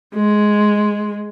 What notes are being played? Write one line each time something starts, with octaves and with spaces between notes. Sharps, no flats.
G#3